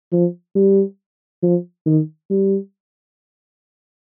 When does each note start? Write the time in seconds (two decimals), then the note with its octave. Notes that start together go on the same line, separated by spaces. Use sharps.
0.12 F3
0.55 G3
1.43 F3
1.86 D#3
2.30 G3